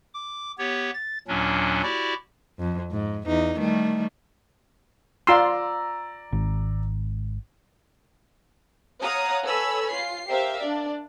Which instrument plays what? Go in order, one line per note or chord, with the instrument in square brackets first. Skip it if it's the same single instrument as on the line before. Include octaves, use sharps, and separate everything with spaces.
[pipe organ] D6
B3 G4 C#5
A6
D#2 A#2 F#3 C#4 D4
E4 F#4 G4 D5
[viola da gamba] F2
G#2
E2 D#4
D#3 G3 A3
[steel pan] F4 C6 [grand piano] D5 A#5 E6
[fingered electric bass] G#1
[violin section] C#5 F5 F#5 A#5 D#6
A4 B4 C#5 G#5 B5 E6
F4 C7
G4 A#4 C5 E5 F5
D4 D5